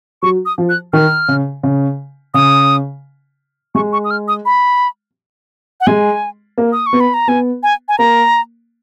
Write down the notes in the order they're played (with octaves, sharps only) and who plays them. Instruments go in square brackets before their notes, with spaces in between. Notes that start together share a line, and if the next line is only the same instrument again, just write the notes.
[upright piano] F#3 [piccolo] C#6
[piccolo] D#6
[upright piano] F3
[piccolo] F#6
[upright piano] D#3 [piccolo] F6
[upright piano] C#3
C#3
[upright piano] C#3 [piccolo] D#6
[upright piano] G#3 [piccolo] C#6
[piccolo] C#6
D#6
F6
D#6
B5
F#5
[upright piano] G#3 [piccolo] G#5
[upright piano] A#3
[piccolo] D#6
C#6
[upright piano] B3
[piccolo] B5
A#5
[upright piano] B3 [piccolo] G#5
[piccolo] G#5
G#5
[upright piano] A#3 [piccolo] A#5